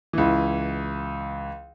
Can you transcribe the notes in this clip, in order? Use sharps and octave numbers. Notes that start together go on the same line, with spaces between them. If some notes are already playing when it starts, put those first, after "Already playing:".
C#2 E3